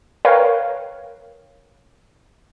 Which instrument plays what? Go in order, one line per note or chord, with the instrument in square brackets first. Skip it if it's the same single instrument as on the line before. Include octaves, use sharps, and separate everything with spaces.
[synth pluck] A#4 B4 C#5 F5 G5